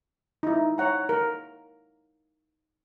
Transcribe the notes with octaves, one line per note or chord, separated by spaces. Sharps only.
D#4 E4
C#5 F#5 A#5
A#4